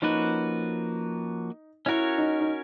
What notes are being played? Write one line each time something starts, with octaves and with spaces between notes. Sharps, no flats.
F3 A#3 C#4 D#4 F#4 B4
C#4 E4 F#4 A#4 C#5
D#4
D#4